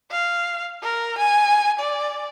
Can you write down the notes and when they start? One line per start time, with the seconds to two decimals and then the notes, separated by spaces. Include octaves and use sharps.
0.11 F5
0.83 A#4
1.18 G#5
1.79 D5